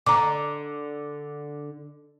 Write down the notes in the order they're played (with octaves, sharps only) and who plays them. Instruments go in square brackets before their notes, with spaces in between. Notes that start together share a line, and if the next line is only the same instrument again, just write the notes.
[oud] D3 [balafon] A#5 D6